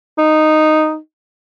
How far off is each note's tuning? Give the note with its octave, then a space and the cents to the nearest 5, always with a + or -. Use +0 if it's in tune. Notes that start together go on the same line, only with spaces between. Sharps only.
D#4 -5